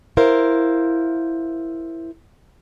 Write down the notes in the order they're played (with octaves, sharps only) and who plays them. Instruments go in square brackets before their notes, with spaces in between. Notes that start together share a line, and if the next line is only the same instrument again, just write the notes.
[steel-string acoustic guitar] E4 A#4 C5 F5